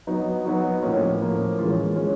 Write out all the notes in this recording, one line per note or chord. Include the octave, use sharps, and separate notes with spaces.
F#3 B3 D#4 F#4
F#3 B3 D#4 F#4
A2 F3 A#3 C#4
A2 F3 A#3 C#4
E3 G#3 C#4 F4
E3 G#3 C#4 F4